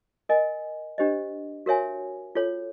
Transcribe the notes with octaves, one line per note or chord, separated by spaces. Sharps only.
A#4 D#5 G#5
D4 G4 C5 D#5
F#4 A#4 C#5 E5 G#5
F4 A4 C#5